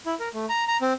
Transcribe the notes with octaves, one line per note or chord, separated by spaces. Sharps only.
E4
A#4
A3
A#5
A#5
C4